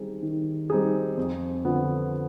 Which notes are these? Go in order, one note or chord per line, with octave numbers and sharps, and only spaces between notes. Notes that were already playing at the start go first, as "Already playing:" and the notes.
Already playing: D#3 G3 C4 D#4 G#4
D#3
G3 C4 D#4 G#4
F2
D3 F3 B3 F4